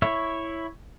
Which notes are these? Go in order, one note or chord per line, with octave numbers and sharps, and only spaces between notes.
E4 C#5 E5